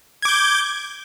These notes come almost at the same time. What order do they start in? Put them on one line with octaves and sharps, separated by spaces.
G#6 D6 G6